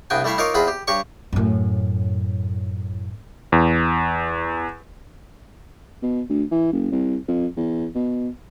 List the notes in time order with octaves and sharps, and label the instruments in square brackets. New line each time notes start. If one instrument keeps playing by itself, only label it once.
[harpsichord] C2 G2 B3 G5 G#5
G3 A3 E4 E5 F5
D#4 F4 A#4 C#5 F5 D6
E2 C4 F4 G#4 B5
G4
G2 G4 C#5 C#6
[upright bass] F#2 A2
[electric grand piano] E2
[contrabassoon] B2
D2
E3
F#1
C2
F2
E2
B2